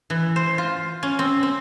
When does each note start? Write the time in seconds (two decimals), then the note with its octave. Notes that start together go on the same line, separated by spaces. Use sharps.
0.10 E3
0.36 C5
0.58 F4
1.03 C#4
1.19 C4
1.43 C4